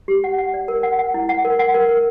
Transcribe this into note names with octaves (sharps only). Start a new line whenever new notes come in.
G4
F#5
F#5
D5
A#4
F#5
F#5
E4
F#5
A#4
F#5
A#4
A#4